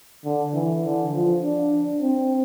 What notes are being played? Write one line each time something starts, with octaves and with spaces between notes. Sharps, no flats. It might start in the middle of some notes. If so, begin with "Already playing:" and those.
D3
E3
D3
F3
D4
C4